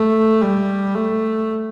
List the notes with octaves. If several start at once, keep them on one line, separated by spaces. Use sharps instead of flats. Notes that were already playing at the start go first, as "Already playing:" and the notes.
Already playing: A3
G3
A3